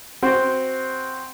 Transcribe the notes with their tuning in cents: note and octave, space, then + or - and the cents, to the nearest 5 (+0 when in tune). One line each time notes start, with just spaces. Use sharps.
C4 +0 F#4 +0